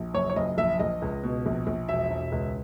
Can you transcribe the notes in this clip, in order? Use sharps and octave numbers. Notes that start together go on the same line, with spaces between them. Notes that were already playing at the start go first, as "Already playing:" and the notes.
Already playing: A#1
F#1 C#5
C#5
F#1 D#5
A#1 E5
A#1 D#5
C#2
B2
A#1
A#1
E1 E5
E1
C#2